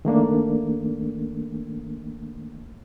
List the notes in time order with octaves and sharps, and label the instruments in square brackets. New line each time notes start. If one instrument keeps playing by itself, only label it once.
[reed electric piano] D#3 A3 A#3 D4